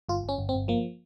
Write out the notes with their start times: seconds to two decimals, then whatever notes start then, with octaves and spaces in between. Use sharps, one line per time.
0.09 G1 F4
0.24 G1 C#4
0.38 G1
0.49 C4
0.54 G1
0.68 F3 A#3